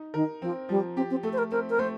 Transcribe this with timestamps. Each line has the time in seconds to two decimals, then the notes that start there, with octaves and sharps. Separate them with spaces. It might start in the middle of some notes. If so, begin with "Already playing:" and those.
Already playing: D#4
0.14 D#3 A#4
0.42 F3 C4
0.69 F3 G3
0.96 C4 G4
1.10 C4
1.23 A3 A4
1.33 C5
1.38 A#4
1.51 C4 A#4
1.70 A#4
1.79 A3 C5